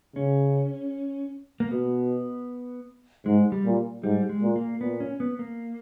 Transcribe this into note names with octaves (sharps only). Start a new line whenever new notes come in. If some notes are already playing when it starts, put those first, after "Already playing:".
C#3 C#4
A#3
B2 B3
G#2 G#3
G3
A#2
G#2 G3
G#3
A#2
A#3
A#2 B3
C#4
B3
A#3